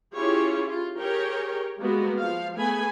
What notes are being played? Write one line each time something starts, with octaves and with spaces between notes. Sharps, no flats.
C#4 E4 F4 G4 G#4 C#5
F4
G4 G#4 A#4 C#5 G5
G3 G#3 A#3 B3 F#4
F3 F5
A3 B3 G#4 G#5 B5